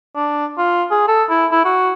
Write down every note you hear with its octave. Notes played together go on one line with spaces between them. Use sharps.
D4
F4
G#4
A4
E4
E4
F#4